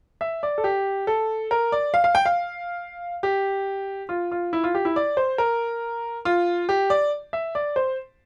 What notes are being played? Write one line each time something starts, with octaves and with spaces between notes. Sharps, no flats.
E5
D5
A4
G4
A4
A#4
D5
F5
F5
G5
F5
G4
F4
F4
E4
F4
G4
E4
D5
C5
A#4
F4
G4
D5
E5
D5
C5